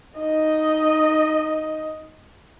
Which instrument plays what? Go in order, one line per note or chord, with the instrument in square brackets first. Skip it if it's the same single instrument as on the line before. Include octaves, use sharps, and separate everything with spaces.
[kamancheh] D#4 D#5